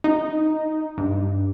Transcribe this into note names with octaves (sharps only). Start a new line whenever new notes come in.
D#4
G2